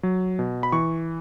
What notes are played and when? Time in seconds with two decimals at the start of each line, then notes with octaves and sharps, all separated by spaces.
0.03 F#3
0.39 B2
0.63 B5
0.72 E3 C#6